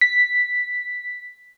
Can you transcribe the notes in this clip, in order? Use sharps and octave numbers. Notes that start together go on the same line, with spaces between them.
B6